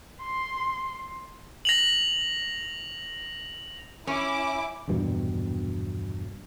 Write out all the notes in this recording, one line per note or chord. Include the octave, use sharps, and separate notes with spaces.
C6
A#6 F7 F#7
C#4 E4 D6
A#1 E2 G2 B2